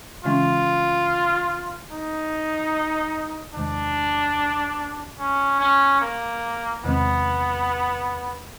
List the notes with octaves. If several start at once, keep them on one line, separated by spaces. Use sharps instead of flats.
C#3 E3 G#3 C#4 F4
D#4
E2 C3 D#3 G#3 D4
C#4
C#4
A#3
E2 C3 D#3 G#3 B3 C4